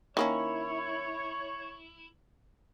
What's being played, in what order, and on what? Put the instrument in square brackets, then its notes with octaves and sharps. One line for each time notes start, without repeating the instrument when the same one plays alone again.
[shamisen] D#3 A#3 C#4 [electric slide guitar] E4 [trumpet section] C#5